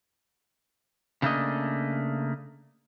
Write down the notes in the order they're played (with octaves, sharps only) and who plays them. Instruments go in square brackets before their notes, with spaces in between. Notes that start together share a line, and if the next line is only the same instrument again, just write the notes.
[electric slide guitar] C#3 F3 A3 A#3 D4 D#5